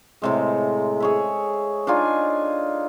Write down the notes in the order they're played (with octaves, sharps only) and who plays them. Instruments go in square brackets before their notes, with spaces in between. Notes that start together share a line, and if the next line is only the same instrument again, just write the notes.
[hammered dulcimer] A2 C3 G#3
G#4 C#5 E5
D4 D#4 F4 G#5